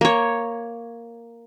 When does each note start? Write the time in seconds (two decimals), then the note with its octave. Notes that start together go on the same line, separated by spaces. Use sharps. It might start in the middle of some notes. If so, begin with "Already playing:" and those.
0.01 A#3 C#5